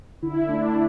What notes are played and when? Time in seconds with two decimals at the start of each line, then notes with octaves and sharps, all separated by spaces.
0.22 D3 E4
0.48 A3 D4